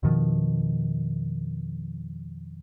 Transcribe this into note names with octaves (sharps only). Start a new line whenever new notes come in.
F2 B2 D#3 F3